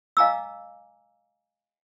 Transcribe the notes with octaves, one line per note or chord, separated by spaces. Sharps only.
D#5 F5 G#5 A#5 D6 E6